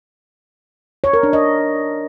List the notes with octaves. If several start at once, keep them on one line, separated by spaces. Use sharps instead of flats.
C#5
A#4
D4
D#5